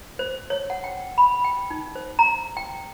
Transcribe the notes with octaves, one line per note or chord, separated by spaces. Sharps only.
C5
C#5
F#5
G5
B5
G5
D#4
C5
A#5
G5